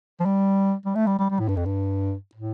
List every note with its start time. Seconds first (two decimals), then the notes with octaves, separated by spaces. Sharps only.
0.20 F3
0.25 G3
0.86 G3
0.95 A3
1.07 G3
1.19 G3
1.30 G3
1.39 A2
1.48 G2
1.57 F2
1.65 G2
2.35 A2